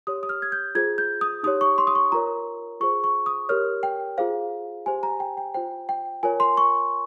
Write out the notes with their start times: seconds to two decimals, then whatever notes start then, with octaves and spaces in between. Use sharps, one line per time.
0.07 G4 C#5 D#6
0.23 D#6
0.29 F6
0.42 G#6
0.52 G6
0.75 F4 G#4 C5 G#6
0.98 G6
1.21 D#6
1.43 D#4 G4 C#5 D#6
1.61 C#6
1.78 C6
1.87 D#6
1.95 C#6
2.12 F4 A#4 C#5 A#5
2.80 F4 G#4 C5 C#6
3.04 C#6
3.26 D#6
3.49 G4 A#4 C#5 F6
3.83 G5
4.18 F4 G#4 C5 F5
4.86 G4 C5 G#5
5.03 A#5
5.20 G5
5.37 G5
5.54 F4 C5 G5
5.89 G5
6.23 F4 A#4 C#5 G#5
6.40 C6
6.57 C#6